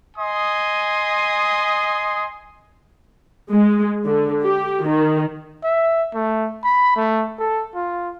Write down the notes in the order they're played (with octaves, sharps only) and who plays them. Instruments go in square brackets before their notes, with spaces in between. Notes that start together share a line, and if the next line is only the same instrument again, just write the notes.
[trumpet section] D#5 G#5 C6 D#6
[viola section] G#3
D3
G4
D#3
[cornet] E5
A3
B5
A3
A4
F4